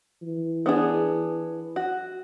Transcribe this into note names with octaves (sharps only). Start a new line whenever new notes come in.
E3
B3 D4 G#4
F#4